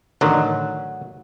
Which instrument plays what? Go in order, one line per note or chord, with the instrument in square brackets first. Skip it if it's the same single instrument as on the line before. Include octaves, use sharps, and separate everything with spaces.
[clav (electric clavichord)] A1 D3 D#3 [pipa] F#3